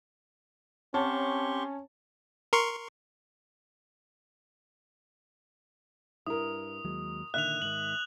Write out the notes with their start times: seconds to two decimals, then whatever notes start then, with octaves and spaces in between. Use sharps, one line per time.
0.94 C4 C#4 G4 C#5 A5 C6 C#6
2.53 A#4 C6 C#6
6.27 G2 E4 A#4 D#6
6.85 D#2 F#3 G#3
7.34 A#2 D3 D#3 E5 F#6 F7
7.62 G#2 D#3 F#7